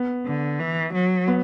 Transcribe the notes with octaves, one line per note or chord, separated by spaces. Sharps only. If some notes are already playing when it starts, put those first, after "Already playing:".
Already playing: B3
D3
E3
F#3
B3